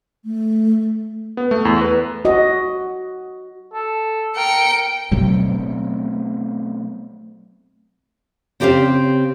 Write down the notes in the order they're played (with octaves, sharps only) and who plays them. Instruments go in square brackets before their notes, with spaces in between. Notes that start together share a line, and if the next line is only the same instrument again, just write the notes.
[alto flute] A3
[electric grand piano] B3
A3
E2
B4
[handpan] F#4 D#5
[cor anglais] A4
[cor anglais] A#4 [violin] G5 C#7
[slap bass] B2 F#3 A3 C4
[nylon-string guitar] C#3 C4 G4 C5 D#5 F5